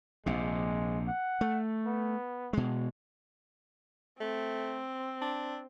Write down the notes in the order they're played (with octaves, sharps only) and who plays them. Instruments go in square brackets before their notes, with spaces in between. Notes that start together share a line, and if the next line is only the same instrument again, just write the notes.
[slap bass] A#1 C3 [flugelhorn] G#3
[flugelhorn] F#5
[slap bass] A3
[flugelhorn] B3
[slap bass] B2 G#3
[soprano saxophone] A3 [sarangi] C4
[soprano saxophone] D4